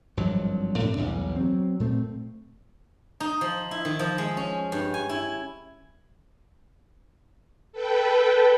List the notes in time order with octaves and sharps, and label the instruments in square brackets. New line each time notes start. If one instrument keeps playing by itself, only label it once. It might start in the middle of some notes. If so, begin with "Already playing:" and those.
[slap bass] G#1 G2 F3 F#3
A2 C3 D4
B1 E2 G2
F#3 C4
A#2 A3 C4
[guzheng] D#4
F3
E4
D#3
F3
G#3
C#4
G2
G#5
E4
[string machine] A4 B4 G5